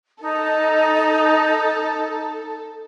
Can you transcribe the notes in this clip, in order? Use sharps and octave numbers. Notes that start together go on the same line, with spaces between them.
D#4 A4